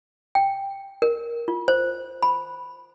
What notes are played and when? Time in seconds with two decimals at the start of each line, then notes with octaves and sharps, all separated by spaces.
0.35 G5
1.02 A#4
1.48 F4
1.68 C5
2.23 B5